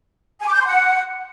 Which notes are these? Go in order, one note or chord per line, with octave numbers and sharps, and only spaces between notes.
G#5
D6
G6
C6
F#5